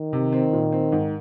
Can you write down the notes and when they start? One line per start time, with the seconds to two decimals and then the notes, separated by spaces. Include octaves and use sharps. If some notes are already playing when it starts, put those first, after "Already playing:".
Already playing: D#3
0.13 C3
0.33 C4
0.53 A#2
0.72 C4
0.92 G#2